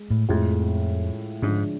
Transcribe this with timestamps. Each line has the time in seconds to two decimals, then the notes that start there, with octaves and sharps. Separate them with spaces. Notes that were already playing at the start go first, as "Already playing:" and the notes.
Already playing: G#3
0.10 A2
0.29 F2 A2 F3 G#3
1.42 G#2 D3 F3 G#3 D4